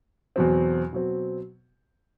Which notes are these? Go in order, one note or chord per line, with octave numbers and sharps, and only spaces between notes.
E2 B2 F#3 C4
B2 F#3 C4